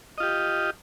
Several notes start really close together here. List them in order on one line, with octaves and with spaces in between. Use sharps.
D#5 F4 G4